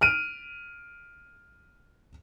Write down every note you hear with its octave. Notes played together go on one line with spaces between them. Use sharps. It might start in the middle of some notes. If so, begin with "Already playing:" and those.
F6 D7 D#7